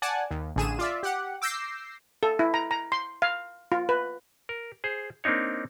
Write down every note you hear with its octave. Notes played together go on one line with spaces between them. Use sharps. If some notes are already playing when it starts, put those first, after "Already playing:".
D5 F#5 G#5 A5
D#2
A1 D3 G#4 D#7 E7
F4 D5 E5
G4 F#5
D6 E6 G6 A#6 C7
A4
E4
A#5
A#5
C6
F5
F4
B4
A#4
G#4 C5
A#3 C4 D4 D#4 C#5